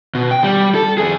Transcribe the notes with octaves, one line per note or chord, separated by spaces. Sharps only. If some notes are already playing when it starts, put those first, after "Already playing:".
B2
G5
G3
A4
F2 G#4